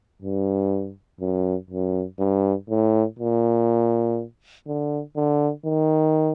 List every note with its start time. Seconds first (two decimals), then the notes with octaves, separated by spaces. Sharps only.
0.22 G2
1.21 F#2
1.70 F#2
2.19 G2
2.69 A2
3.19 A#2
4.67 D3
5.16 D3
5.65 D#3